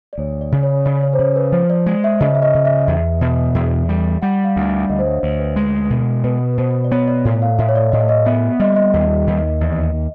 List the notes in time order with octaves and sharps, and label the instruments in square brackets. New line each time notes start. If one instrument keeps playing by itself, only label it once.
[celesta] D5
[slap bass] D2 [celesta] C#5
[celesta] D5
[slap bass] C#3
[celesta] C#5
[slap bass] C#3 [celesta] D5
[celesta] C#5
C5
[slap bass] C#3 [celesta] C#5
[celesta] B4
[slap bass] F3 [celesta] C5
[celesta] D5
[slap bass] G#3
[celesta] E5
[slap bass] C#3 [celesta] D#5
[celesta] E5
D#5
[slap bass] C#3
[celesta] E5
[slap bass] E2
B2
E2
G3
[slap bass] G3 [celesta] F#5
[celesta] F#5
F5
[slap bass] D2
[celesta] E5
[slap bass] D2 [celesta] D#5
[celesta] C5
C#5
[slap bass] D2 [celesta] C5
[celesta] B4
[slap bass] G#3
B2
[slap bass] B2 [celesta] B4
[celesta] B4
[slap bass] B2 [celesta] C5
[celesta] D5
[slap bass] B3 [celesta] C#5
[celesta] D5
[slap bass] A2
[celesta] F5
[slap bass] A2 [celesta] E5
[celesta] C#5
D5
[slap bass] A2 [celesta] D#5
[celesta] D#5
[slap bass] B3 [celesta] E5
[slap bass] G3 [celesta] D#5
[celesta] D#5
[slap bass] D#2
D#2
E2